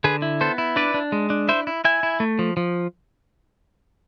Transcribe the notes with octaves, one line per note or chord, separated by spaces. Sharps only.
D3 G#4 B4
E4
B3 A4 C5
E4
D4 B4 D5
D4
G#3
D4
E4 C5 E5
E4
E4 E5 G#5
E4
A3
F3
F3